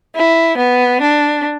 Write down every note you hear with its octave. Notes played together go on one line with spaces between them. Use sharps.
E4
B3
D4